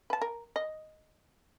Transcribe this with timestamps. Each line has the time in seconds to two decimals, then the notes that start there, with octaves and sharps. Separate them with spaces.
0.10 B4 A5
0.22 A#4
0.56 D#5